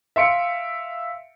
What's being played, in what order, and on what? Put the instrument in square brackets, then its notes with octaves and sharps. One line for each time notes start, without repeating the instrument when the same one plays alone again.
[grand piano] E5 F5 C6 C#7 D7